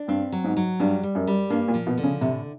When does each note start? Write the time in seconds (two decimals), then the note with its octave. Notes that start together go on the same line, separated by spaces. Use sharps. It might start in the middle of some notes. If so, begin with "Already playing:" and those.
Already playing: D4
0.08 G2 C4
0.32 F#3
0.44 G#2
0.57 F#3
0.80 G2 G3
1.03 G3
1.15 F#2
1.27 G3
1.50 G2 A#3
1.68 A#2
1.74 F3
1.87 B2
1.98 D3
2.03 C#3
2.21 A2 C3